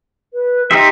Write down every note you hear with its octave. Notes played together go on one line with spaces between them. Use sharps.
B4
D#4 G4 E5 C6